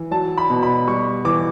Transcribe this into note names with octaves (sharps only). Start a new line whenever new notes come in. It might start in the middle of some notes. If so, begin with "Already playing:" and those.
Already playing: E3
F#3 A5
B5
B2
B5
G3 C#6
E3 D6